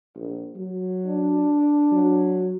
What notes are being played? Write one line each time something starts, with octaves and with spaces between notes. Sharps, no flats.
A#1
F#3
D4
F#3